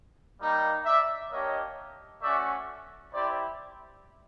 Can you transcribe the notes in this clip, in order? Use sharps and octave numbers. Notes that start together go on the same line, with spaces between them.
G3 A#3 D#4
D5 E5
A#3 D4 G4 C#5 D#5
A3 C#4 F#4 D5 E5
C4 E4 G4 C5 D5